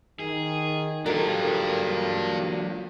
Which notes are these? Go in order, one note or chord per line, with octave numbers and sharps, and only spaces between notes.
D#3 G#4
F#3 A#3 D4 F4 G4 A4 A#4 F5